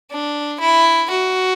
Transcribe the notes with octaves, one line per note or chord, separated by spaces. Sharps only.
D4
E4
F#4